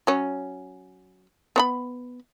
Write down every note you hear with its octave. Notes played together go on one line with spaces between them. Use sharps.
F#3 C#4
B3 C#5 B5